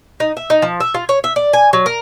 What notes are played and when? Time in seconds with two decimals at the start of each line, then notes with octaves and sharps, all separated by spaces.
0.20 D#4
0.37 E5
0.50 D#4
0.62 F3
0.80 E5
0.94 F4
1.09 C#5
1.24 E5
1.36 D5
1.53 G#5
1.73 F#3
1.86 A#4